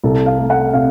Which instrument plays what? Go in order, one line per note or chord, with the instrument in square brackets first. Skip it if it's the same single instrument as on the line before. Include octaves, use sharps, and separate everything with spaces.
[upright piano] C2 [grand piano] A4
[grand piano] F5
[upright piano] A3
[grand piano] F#5
[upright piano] C3 [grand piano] F5